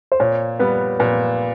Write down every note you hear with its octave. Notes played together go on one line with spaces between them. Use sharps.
C5
A#2 C#5
G3 B3 B4
A#2 B4